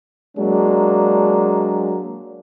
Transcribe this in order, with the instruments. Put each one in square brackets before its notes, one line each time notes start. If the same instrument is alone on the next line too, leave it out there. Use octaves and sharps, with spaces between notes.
[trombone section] F#3 G#3 A#3 D4